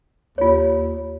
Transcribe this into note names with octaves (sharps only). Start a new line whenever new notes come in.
D#2 F4 C#5